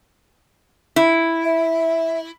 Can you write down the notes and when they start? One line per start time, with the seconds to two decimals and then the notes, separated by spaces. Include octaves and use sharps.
0.96 E4
1.45 E5